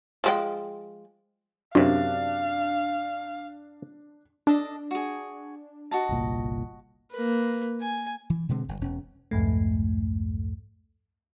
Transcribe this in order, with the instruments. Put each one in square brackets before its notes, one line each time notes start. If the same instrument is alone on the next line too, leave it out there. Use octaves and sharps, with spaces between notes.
[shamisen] F3 G#3 G5
[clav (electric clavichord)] F#2 C3 [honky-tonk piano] D4 [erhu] F5
[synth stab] D4 [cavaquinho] A4 D#5
[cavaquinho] F#4 G#4
F#4 D#5 A5
[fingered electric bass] G1 C2 A#2
[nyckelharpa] A#3 B4
G#5
[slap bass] E3
B2 D3 G#3 C4
G1
E1 C#4
[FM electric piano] C2 F2 G#2 A3